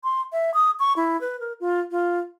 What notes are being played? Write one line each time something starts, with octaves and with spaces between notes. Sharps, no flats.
C6
E5
D#6
C#6
E4
B4
A#4
F4
F4